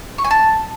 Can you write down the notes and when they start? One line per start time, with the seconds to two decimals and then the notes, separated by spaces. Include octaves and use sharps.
0.18 C#6
0.24 G#5
0.31 A5